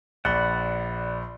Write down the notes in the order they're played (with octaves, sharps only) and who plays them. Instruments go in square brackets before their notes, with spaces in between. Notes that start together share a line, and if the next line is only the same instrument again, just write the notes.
[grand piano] A#1 [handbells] D5 B5 [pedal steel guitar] F#5